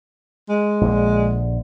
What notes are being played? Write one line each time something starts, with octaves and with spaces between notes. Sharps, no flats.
G#3
A#1 D3